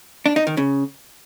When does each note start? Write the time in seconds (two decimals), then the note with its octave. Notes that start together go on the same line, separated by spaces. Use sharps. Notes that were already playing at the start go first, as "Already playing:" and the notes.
0.26 D4
0.36 D#4
0.47 D#3
0.57 C#3